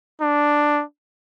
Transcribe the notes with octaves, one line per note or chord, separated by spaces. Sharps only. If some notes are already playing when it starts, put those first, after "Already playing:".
D4